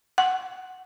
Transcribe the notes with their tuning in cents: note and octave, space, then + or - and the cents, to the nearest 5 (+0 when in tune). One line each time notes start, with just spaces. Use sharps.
F#5 +10